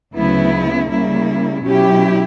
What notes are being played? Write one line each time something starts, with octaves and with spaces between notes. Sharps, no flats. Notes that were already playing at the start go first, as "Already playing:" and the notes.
D2 C#3 F#3 B3 E4
C#3 G3 A#3 E4
B2 F#3 C#4 E4 G4